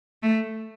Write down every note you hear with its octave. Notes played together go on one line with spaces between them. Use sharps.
A3